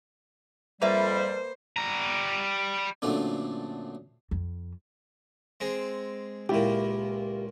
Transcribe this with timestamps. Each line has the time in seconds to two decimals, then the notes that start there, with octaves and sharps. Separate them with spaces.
0.82 F2 G3 A#3 B4 C5 E5
1.76 G3 A#5
3.02 F#2 A#2 D3 A3 C4 D4
4.31 F2
5.60 G#3 C4
6.49 C#2 A#2 E4 G4